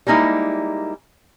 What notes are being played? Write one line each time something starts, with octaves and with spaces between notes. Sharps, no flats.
G3 G#3 A#3 D#4 E4